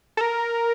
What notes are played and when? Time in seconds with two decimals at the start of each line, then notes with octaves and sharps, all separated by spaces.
0.17 A4
0.21 A#4